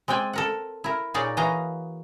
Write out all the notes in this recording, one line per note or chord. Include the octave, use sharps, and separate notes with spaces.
G#3 C4 D5 G5 G#5
A4 A#4 F#5
E4 A#4
A#2 D#4 G#4 C#5 D5 A#5
E3 A#3 F#4 D#5 F5 A#5